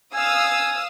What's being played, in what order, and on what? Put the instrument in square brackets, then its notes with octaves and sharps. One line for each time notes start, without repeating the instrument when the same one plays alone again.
[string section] F5 D#6 E6 [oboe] G#5